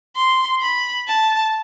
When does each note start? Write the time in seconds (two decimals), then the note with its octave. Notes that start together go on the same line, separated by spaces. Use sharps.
0.16 C6
0.62 B5
1.07 A5